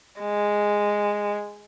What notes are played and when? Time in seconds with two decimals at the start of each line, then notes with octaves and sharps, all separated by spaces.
0.20 G#3